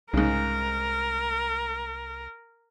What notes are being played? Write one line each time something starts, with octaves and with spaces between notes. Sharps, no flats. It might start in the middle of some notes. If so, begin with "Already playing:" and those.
C2 G#2 C#3 A#4